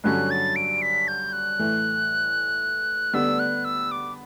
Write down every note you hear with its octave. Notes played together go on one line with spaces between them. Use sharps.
G2 D3 F#3 C#4 F#6
A6
D7
B6
G6
F#6
A2 E3 A3
D3 G3 B3 D4 E6
F#6
E6
D6